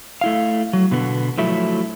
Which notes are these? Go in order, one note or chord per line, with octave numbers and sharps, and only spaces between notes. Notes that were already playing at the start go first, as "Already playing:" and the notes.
A3 E4 F5
F#3
B2 D3 B3
F3 F#3 A3 E4